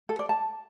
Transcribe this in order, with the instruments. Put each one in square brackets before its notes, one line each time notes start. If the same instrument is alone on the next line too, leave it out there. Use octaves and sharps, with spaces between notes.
[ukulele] A4
D5
A5